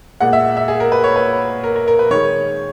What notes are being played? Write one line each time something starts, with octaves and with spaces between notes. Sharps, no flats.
A#2 G#3 F#5
E5
E5
G#4
A#4
B4
C#5
B4
A#4
A#4
A#4
B4
D#3 G#3 C#5